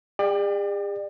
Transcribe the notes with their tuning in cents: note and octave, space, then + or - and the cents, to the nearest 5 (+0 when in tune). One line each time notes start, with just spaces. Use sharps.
G#4 -45 D5 +30 G5 +0